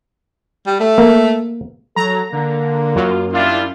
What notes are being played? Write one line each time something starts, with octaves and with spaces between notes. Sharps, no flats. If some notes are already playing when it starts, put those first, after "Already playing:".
G3
A3
A#3
F#3 A4 A#5
D3 A#3
F#2 F4
G3 D4 E4 F4